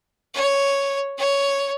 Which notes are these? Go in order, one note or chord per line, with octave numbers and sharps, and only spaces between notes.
C#5
C#5